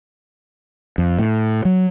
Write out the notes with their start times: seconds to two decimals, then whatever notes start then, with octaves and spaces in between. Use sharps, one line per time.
0.98 F2
1.19 A2
1.65 F#3